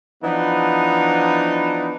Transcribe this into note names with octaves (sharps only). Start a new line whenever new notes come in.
E3 F3 B3 D4 D#4